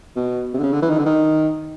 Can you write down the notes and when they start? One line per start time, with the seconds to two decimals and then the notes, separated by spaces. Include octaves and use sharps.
0.16 B2
0.54 C3
0.59 D3
0.63 C#3
0.73 D3
0.82 E3
0.90 D#3
0.99 D3
1.06 D#3